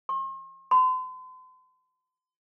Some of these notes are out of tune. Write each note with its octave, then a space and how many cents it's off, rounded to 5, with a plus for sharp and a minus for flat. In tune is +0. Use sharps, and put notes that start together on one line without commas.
C6 +45
C6 -45